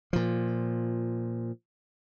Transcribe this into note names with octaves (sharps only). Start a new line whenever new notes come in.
A#2 F3